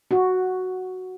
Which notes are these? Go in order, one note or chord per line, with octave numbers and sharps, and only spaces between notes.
F#4